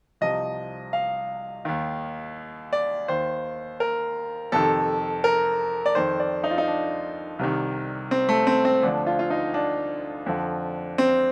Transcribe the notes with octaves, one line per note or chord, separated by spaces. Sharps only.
C2 C3 F3 D#5
F5
D#2 D#3
D5
D#2 D#3 C5
A#4
F2 C3 D#3 A4
A#4
D5
F2 D#3 C5
D5
D#4
F4
D#4
D4
C2 C3 D#3
C4
A3
C4
C4
D2 D3 F3 D4
F4
F4
D#4
D4
F2 D3 F3
C4